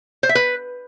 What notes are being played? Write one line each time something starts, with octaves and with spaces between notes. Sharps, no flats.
C5
E5
B4